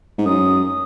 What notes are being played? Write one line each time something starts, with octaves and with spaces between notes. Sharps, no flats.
G#2
F#2 D#6